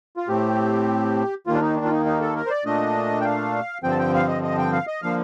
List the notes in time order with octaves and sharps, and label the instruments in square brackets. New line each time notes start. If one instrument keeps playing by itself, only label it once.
[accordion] F4
A2 A3 C4 G4
D#2 D#3 A#3 F4
D4
D#4
D4
F4
D#4
D#4
A4
A#4
C5
D5
A#2 A3 D4 D#5
G5
F5
G2 D3 F3 C4 G5
A5
G5
F5
D#5
D#5
G5
F5
D#5
D3 F3 A#3 F5